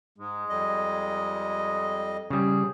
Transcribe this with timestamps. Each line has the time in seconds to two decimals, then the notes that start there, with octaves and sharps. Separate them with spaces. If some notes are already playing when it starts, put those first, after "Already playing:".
0.18 G#2 G#3
0.50 F2 G3 D#5
2.30 C#3 G3 G#4